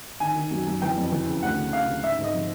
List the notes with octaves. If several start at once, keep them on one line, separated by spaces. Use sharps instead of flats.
D#3 G#5
D#3
F#2
F#2
E3 G5
F2
E3
C#3
D2 F#5
C#3
C#3 F5
C#3
G#2 E5
G#2
D#5
F3